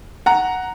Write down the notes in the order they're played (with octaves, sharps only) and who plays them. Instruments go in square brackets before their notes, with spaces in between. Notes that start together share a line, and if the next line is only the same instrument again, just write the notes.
[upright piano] F#5 A#5